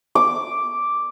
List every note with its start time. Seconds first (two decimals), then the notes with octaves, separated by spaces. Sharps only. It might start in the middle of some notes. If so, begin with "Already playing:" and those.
0.15 D6